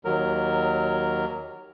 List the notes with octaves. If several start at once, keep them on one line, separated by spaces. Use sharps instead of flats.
D#2 F#3 A#4